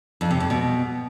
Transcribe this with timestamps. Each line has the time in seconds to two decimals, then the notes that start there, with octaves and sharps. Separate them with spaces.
0.21 F2
0.31 C3
0.40 F2
0.50 B2